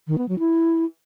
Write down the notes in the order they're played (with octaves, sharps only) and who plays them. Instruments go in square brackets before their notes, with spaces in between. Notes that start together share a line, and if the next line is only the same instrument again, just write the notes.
[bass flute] D#3
B3
F#3
E4